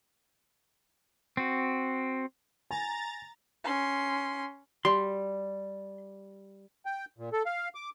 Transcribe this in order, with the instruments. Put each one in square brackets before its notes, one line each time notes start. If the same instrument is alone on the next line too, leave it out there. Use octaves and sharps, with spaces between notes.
[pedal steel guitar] C4 F#4
[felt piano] G#5 [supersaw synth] A#5 A6
[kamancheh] C#4 C6
[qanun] G3 [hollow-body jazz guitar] C6
[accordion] G5
A#2
A4
F5
D6